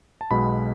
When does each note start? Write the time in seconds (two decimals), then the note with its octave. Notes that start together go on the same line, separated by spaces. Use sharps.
0.21 A5
0.31 B1 B2 G#3 B3 B5